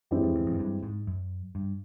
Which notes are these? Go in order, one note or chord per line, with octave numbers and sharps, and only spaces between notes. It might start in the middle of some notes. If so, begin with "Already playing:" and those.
F#2 E3 G#3 C4 E4 G4
F2
E2
F2
F#2
G2
G#2
F#2
G2